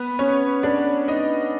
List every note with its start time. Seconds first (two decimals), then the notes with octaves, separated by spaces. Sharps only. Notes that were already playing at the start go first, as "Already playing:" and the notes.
Already playing: B3 B4
0.19 C#4 C#5
0.63 D4 D5
1.08 D#4 D#5